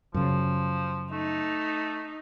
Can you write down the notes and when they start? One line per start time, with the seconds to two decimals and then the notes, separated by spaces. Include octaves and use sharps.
0.14 F#2 C#3 F3
1.12 A3 D#4